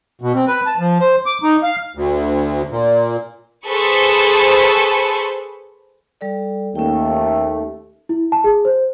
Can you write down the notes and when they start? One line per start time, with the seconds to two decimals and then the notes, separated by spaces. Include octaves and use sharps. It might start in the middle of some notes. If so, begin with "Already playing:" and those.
0.21 B2
0.34 C4
0.48 B4
0.66 A5
0.79 F3
1.00 C5
1.26 D6
1.43 D#4
1.63 F5
1.95 D2
2.71 A#2
3.67 G#4 A4 B4 C5 C#6
6.21 G3 A4 D5
6.75 D#2 A3 C#4 G5
8.09 E4
8.32 A5
8.44 G#4
8.65 C5